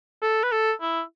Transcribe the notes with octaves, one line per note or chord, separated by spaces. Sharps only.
A4
B4
A4
E4